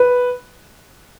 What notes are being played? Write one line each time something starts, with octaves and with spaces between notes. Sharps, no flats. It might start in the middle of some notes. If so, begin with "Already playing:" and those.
Already playing: B4